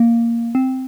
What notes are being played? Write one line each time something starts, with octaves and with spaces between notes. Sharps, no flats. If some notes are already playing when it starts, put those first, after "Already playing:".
Already playing: A#3
C4